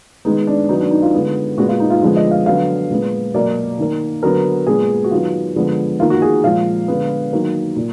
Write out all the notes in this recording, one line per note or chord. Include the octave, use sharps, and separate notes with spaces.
D#3 G#3 B3 D#4
D4
D#3 F#3 B3 D#4
D4
D#4
F4
D3 G#3 B3
A#2 G#3 B3 F#4
F4
D#4
F4
D3 F3 G#3 B3 F4
D#5
F5
D3 F#3 B3 F5
A#2 G#3 B3
B2 F#3 A#3 D5
D#3 A#3
D3 F#3 B3 A#4
A#2 G#3 B3 G#4
F#4
D#3 F#3 B3 F4
D3 F3 G#3 B3
D#3 A#3 F4
F#4
G#4
A#2 F3 G#3 F5
D3 G#3 B3
D#3 F#3 A#3
A#2